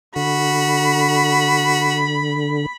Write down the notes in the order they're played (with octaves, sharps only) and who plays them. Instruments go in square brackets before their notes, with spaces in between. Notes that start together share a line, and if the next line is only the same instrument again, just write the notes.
[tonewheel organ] D3 [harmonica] F#4 [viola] B5